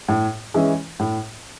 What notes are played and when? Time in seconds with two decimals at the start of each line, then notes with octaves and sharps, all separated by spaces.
0.08 A2
0.54 E3 G#3 C#4 E4
0.99 A2